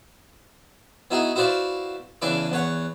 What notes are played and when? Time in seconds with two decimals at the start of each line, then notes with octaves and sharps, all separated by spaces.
1.11 B3 D#4 E4 F#4 G#4
1.36 E4 F#4 B4 C5 D5 F5
2.22 E2 C#3 D4 E4 B4 D6
2.52 E2 B4 C#5 F#5